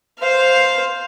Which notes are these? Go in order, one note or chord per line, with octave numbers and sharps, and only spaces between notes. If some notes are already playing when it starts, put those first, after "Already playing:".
C5 F5